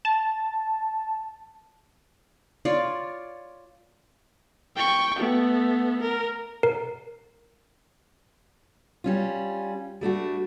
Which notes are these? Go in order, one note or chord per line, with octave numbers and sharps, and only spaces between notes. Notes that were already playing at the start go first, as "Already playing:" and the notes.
A5
F4 C#5 D5
G5 C#6
A3 B3
A#4
A#4
G3 C#4 F4
G3 A3 D4 F#4